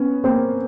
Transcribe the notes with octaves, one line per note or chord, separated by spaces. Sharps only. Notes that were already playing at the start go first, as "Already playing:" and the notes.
Already playing: B3 C#4
A#3 C4